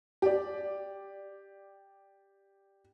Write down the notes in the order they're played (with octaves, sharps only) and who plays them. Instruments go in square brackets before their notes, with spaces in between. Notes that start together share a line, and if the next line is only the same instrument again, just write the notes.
[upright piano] G4 D5